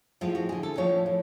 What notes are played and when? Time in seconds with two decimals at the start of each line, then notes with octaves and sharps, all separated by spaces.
0.21 A2 F3 G#3 F4
0.35 F#4
0.49 D3 G#3 G#4
0.63 A4
0.77 A2 F3 A3 C#5
1.06 A2